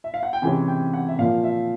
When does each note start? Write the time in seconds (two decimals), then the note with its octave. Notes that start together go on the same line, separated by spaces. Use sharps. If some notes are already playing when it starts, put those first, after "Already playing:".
0.04 E5
0.14 F5
0.23 F#5
0.33 G5
0.42 C3 E3 G#3 C#4 G#5
0.68 G5
0.94 F#5
1.09 E5
1.18 A#2 F3 A#3 F5
1.44 E5